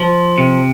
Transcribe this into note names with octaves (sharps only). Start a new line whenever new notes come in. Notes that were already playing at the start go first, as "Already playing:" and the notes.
Already playing: F3
C3